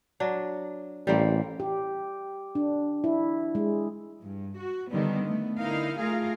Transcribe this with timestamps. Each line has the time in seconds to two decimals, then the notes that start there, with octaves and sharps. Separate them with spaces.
0.20 F#3 D4
1.07 A1 G3 A#3 C4
1.60 G4
2.55 D4
3.04 E4
3.55 G#3
4.23 G2
4.59 F#4
4.93 D3 D#3 G3 B3
5.25 A3 B3
5.60 D3 D#4 E4 A#4 F5
6.00 A3 F4 G#4 A#4 F5